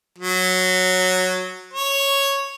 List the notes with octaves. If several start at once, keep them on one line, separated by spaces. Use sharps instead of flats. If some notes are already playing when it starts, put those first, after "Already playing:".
F#3
C#5